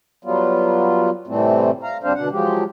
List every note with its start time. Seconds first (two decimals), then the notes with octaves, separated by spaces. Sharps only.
0.25 F#3 G3 B3 F4
1.27 A2 C3 E3 G3 A3 C4
1.83 F5 A#5
2.03 D2 G3 C4 D4 C5 F5
2.15 D2 B2 D4 F#5
2.32 F3 F#3 G#3 G4